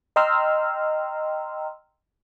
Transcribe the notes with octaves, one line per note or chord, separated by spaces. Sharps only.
D#5 G5 A#5 C6 E6 F6